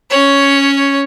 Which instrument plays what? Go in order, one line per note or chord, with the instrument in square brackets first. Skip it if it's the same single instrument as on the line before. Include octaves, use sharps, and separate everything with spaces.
[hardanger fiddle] C#4 C#5